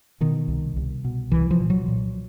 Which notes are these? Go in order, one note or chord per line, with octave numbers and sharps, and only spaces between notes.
B2 D#3
C2
C2
B2
C2 E3
F3
A#2
F#3
A#2